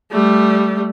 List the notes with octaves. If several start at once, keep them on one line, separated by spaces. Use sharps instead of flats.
G3 A3